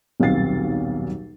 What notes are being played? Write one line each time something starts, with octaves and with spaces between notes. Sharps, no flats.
D#1 B1 C4 F5 A6 C7